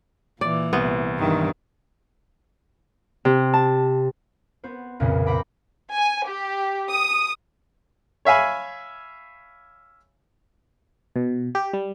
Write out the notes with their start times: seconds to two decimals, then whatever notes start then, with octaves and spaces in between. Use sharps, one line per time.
0.41 A#2 E3 D5
0.73 C2 B3
1.19 G2 D#3 E3
3.25 C3
3.54 A5
4.64 B3 F#4 C5
5.00 B1 F2 A#2 C#3 E3
5.26 C5 F#5 G5 A#5 B5 D6
5.93 G#5
6.26 G4
6.89 D#6
8.25 C#5 E5 F5 G#5 B5
11.16 B2
11.55 G4
11.73 G3